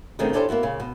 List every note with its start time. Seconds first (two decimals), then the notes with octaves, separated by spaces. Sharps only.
0.19 B2 D3 D#3 A3 C4 G#4
0.33 C#4 D4 E4 G4 A4 C5
0.49 A#3 B3 E4 F#4
0.63 A#2 C#3
0.80 B2